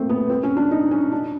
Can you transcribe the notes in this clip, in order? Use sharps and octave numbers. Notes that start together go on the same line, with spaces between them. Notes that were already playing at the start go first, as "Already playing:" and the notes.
Already playing: A3 A#3 C4
B3
C4
C#4
D4
D#4
C#4
D4